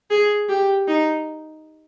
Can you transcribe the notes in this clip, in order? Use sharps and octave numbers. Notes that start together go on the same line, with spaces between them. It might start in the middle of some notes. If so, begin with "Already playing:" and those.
G#4
G4
D#4